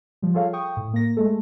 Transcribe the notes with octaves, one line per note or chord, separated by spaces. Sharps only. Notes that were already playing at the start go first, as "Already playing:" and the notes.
F3 G3
F4 G#4 A4 C#5 F5
G5 C#6 D#6
A2
A#3 A#6
G#3 A3 A4